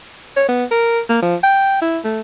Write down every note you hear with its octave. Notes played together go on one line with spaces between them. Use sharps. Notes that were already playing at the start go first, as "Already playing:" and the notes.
C#5
B3
A#4
A#3
F3
G5
E4
A3